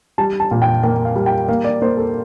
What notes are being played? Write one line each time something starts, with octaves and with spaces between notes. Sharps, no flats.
G3 A5
A5
A#2
G5
A#3 G5
F5
G3
G5
A#3 F5
D5
A#3 C5
A4